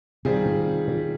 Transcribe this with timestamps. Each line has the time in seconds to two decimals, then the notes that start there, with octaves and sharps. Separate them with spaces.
0.25 C3 D#3 G3 C4 F4 G#4
0.46 G#2
0.88 A#2